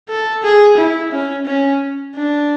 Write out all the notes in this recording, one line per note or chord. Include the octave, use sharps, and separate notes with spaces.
A4
G#4
E4
C#4
C#4
D4